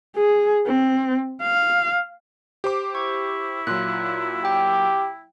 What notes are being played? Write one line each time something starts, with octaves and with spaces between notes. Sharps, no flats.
G#4
C4
F5
G4 C5 D6
E4 C#6
A#2 F#3 F4 F#6
G4 G5